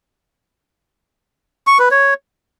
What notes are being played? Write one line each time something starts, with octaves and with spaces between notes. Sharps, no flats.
C#6
B4
C#5